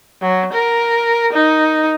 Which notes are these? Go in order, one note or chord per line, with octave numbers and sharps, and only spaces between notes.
F#3
A#4
D#4